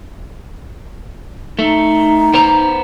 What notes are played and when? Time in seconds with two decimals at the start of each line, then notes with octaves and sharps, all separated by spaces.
1.59 A3 D#4
2.34 B3 C5 A#5